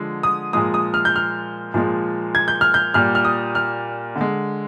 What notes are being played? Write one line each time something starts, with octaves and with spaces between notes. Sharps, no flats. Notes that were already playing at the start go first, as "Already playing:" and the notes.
Already playing: D3 F3 G#3
D#6
A#2 F3 G#3 D#6
D#6
F6
G6
F6
A#2 F3 G#3
G#6
G6
F6
G6
A#2 G3 F6
F6
D#6
F6
D3
G#3